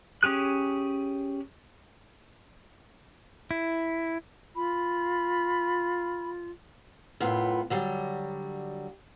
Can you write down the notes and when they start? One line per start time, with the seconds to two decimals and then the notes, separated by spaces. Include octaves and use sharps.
0.23 C#4 G4 G#4 F#6
3.51 E4
4.56 F4 B5
7.20 F#2 A2 B3 F4
7.70 D3 F#3 G3